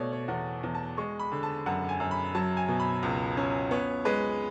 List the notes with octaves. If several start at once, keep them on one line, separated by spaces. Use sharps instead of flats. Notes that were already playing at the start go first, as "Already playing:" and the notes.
Already playing: B2 A3 C#5 D5
C#5
E2 F#5
E2
A5
G#3 C#6
B5
D3
A5
F#2 F#5
G#5
F#2
B5
F#3 A5
G#5
B2
B5
C#2
C#4
B3 C#5
G#3 B4